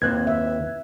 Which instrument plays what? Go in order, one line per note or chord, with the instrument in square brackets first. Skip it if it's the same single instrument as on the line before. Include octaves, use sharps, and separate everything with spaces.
[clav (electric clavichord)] D#2 C4 [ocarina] B4 [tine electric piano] F#6 G#6
[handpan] E5